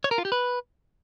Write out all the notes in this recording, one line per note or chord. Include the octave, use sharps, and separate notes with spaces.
C#5
A#4
F4
G4
B4